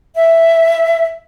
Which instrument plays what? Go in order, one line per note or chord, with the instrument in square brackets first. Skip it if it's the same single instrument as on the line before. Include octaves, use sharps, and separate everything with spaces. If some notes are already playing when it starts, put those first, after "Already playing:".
[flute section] E5